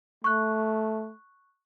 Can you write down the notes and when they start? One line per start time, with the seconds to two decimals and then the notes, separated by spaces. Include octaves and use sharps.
0.24 A3 C#6 F#6